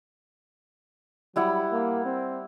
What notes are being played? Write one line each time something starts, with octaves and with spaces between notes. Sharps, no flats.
F#3 G3 E4 F#5
A#3
C4